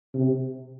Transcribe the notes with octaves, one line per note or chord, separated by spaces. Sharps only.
C3